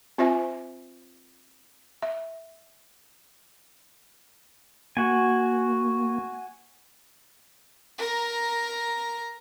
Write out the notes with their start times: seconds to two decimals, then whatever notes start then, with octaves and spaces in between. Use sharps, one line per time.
0.18 C4 F4 C5 E5 G#5
2.02 E5
4.97 A#3 F#4 G#5
7.98 A#4 A#5